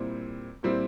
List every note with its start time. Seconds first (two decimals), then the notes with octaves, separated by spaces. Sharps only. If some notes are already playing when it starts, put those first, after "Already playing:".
Already playing: A#2 G3 C4 E4
0.63 A#2 G3 C4 E4